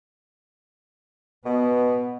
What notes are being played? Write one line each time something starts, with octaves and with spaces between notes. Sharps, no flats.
B2 B3